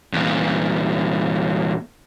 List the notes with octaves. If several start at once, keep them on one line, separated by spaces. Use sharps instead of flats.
E2 A#2